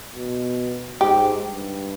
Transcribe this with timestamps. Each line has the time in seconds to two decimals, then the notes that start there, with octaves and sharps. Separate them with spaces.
0.15 B2
1.01 G#2 G4
1.44 G2